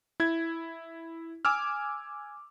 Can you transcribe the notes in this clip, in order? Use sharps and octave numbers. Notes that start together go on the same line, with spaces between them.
E4 G#6
G#5 D6 E6 F6